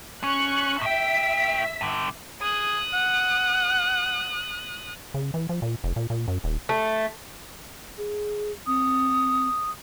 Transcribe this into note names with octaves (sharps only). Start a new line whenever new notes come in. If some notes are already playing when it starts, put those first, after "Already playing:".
C#4 C#6 F#6
A2 E5 G5 B6
G2 D3
G#4 D#6 F#6
F#5
C#3
E3
F3
A#2
F1
A#2
A#2
F#2
D#1
A3
G#4
C4 D#6